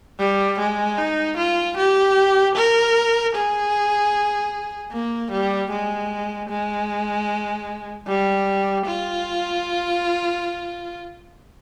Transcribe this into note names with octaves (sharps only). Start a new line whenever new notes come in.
G3
G#3
D#4
F4
G4
A#4
G#4
A#3
G3
G#3
G#3
G3
F4